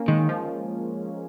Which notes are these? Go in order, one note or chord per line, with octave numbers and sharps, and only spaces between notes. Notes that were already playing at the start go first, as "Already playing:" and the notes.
Already playing: A#3 C#4
D#3 G#3
F3